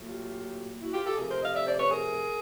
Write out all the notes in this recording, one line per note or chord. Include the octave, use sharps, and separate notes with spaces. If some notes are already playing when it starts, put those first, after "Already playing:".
Already playing: A#2 F#3 A3
F4 G4
E4 F#4
F4 G4
G4 A4
C3 F3 A3 G#4 A#4
A#4 C5
D#5 F5
D5 E5
C5 D5
B4 C#5
G#4 A#4